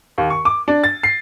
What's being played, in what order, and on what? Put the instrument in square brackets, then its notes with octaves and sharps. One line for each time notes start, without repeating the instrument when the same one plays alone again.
[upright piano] D#2
C#6
D6
D4
A6
C7